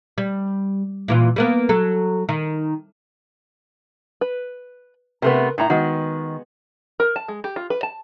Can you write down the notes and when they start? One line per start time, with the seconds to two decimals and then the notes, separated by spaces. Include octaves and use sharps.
0.18 G3
1.08 A#2 E3 F4
1.36 G3 A#3 B3
1.69 F#3 A4
2.29 D#3
4.21 B4
5.22 C3 A3 B3 A#4 B4
5.58 A2 D#3 E4 A#5
5.70 D#3 G#3 B3 F#4
7.00 A#4
7.16 A5
7.28 G#3
7.44 G4
7.56 F4
7.70 B4
7.83 A5